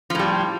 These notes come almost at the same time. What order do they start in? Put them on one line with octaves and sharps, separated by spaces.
F3 A2 G3